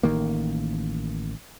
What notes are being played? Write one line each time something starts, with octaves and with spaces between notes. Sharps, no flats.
A1 D#3 A#3